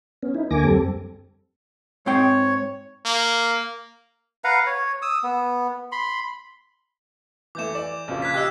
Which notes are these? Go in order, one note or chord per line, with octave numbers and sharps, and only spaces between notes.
B3 C#4
D#4 E4
D2 D3 A#3 G#5 D6 A#6
F#2 G3 C4 A4
G#2 C4 C#5 G5
A#3
B4 F5 F#5 A#5
C#5
D#6 E6
B3
B5 C6
E3 A3 D6 G6 E7
E3 D5
A#1 C#3 F3
F#6 G#6 B6
G4 D#5 F5 E6 F#6